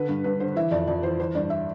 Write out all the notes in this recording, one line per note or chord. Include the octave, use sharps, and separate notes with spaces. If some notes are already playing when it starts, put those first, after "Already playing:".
Already playing: D3 B4
G2
G2 B4
D3 C5
E3 E5
F2 D5
F2 D5
E3 C5
E3 C5
G2 D5
E5